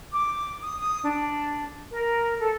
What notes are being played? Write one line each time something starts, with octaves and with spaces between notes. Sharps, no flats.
D6
D#6
D#6
D4
A#4
A4